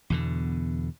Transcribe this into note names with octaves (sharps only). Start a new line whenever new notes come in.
E2 B2 D3